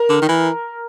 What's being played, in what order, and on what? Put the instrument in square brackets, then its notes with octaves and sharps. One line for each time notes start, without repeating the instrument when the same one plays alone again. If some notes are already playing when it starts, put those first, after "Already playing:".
Already playing: [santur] A#4
[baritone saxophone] D3
D#3
E3